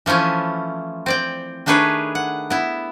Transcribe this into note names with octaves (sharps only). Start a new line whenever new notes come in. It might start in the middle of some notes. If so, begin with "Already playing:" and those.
E3 F3 A3 C#4 E4
C4 D5 G5
D#3 A3 D4 G#4 B4 C#5
F#5
B3 E4